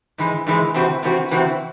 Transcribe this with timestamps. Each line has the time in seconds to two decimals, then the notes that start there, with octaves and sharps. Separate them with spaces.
0.18 G#2 E3 G#3
0.46 G#2 E3 G#3
0.74 C3 E3 C4 F#4
1.03 C3 E3 C4 F#4
1.31 C3 E3 C4 F#4